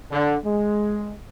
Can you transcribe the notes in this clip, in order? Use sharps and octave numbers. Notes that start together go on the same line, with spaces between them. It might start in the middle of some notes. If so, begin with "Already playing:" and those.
D3
G#3